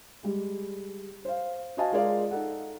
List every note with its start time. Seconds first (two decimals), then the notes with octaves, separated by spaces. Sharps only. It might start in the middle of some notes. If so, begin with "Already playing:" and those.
0.23 G3 G#3
1.25 C5 F5
1.77 F#4 C5 D#5 F5 G#5 A5
1.92 G#3 F4 G#4 A#4 D5 F5
2.31 D#4 A4 F#5